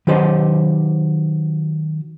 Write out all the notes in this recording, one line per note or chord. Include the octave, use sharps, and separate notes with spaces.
D#3 F#3 G4 C5 D#5